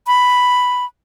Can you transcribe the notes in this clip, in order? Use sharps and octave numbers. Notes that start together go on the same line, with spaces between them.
B5